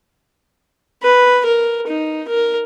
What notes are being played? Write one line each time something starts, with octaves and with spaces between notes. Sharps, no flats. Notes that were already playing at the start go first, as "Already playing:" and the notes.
B4
A#4
D#4
A#4